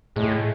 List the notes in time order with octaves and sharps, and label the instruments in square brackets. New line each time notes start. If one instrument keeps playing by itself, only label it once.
[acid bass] A2 [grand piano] G#3